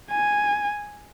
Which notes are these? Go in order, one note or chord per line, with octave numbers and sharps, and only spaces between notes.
G#5